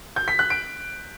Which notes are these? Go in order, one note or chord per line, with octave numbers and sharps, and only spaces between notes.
G6
B6
F#6
D7